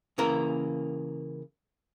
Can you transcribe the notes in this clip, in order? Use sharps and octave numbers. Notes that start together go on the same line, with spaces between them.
C#3 E3 A#3 A#4